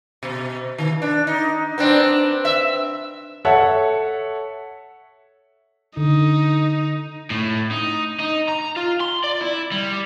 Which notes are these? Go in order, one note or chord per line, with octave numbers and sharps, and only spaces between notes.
B2
D#3
D4
D#4
B3 C4 D4
E5
A4 C#5 E5 F#5
D3 D#4
A2
D#4
D#4
A#5
F4
C6
D5
E4
G3